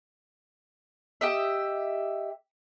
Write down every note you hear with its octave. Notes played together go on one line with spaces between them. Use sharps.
G4 D#5 E5